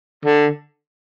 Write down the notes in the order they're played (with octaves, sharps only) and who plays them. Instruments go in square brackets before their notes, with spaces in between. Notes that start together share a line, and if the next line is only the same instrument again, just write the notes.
[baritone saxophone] D3